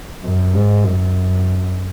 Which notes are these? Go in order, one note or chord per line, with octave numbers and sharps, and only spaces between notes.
F#2
G#2
F#2